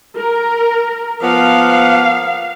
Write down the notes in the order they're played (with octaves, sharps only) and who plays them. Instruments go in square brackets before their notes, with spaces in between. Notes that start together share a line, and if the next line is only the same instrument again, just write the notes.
[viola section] A#4
[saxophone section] F3 A#3 B3 [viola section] F5